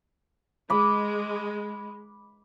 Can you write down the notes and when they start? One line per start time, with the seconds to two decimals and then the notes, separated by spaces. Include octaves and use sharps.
0.70 G#3 B5 D6